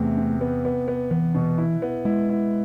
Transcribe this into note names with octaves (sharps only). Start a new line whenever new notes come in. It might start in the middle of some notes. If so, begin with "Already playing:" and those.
Already playing: E2 C3 A3
C3
B3
B3
B3
E3 B3
B2
E4
B3
G#3 E4
E4